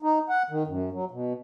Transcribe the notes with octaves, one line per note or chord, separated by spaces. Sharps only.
D#4
F#5
D#3
F#2
F#3
B2